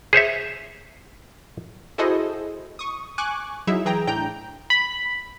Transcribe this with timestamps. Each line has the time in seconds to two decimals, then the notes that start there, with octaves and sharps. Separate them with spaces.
0.13 G#4 C5 C#5 E5
1.98 E4 F#4 G#4 A4 C5 D#5
2.79 C#6 D#6
3.18 G#5 C#6 D6 F#6
3.67 F#3 D#4 E4 G#4 E5
3.85 E3 G#4 G5 A#5
4.07 A2 D4 G5 A#5 G6
4.70 B5